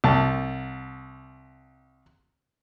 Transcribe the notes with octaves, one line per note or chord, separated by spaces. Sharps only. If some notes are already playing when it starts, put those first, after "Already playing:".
C2 A5